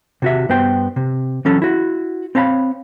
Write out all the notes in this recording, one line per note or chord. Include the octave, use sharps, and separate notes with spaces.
C3 F#4 E5
G2 B3 C5 G5 C6
C3
E3 F#3 C#4 A4
E4 F#4
C4 C#5 F5 A#5 B5